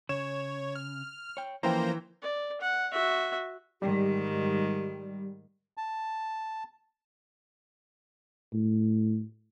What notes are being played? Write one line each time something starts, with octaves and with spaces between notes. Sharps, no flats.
C#3 C#5 E7
F6
C#5 G5
E3 F3 A#3 C#4 C5 G5 A#5
D5
F#5
F#4 E5
G#2 D#3 G3 G4
A5
A2